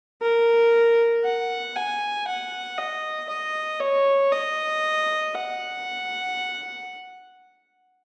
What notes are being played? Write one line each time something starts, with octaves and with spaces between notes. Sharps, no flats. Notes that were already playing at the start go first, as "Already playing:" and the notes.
A#4
F#5
G#5
F#5
D#5
D#5
C#5
D#5
F#5